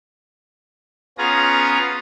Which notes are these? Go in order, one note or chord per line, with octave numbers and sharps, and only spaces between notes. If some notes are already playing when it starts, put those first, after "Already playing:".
B3 C#4 F4 G#4 A#5